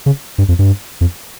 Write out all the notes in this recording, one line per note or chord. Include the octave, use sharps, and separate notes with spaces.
C#3
G2
F2
G2
F2